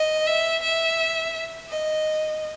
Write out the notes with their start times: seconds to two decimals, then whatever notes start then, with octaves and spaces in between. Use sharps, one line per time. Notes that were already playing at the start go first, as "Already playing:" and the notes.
Already playing: D#5
0.27 E5
0.62 E5
1.70 D#5